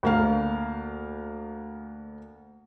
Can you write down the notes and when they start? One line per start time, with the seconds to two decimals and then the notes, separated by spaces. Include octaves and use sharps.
0.03 D2 A#3 F5